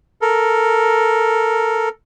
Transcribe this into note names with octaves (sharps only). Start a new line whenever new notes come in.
A4 A#4